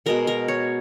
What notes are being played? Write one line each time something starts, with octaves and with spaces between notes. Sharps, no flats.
B2 G#3 B3 A#4
A#4
C#5